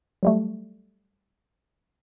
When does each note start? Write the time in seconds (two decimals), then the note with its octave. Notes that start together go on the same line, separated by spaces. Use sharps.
0.23 F#3 G3 A3